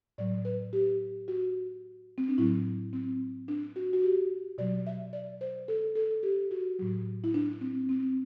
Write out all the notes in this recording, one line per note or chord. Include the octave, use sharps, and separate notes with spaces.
A2 F#3 D5
B4
G4
F#4
C4
D4
A2 F#3 E4
C4
D4
F#4
F#4
G4
B2 F#3 D5
E5
D5
C5
A4
A4
G4
F#4
A2 F#3
E4
D4
C4
C4